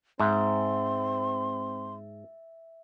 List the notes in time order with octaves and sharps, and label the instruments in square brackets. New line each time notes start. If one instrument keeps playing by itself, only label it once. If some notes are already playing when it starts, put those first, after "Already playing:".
[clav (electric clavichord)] G#2 [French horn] C4 [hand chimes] E5 [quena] C6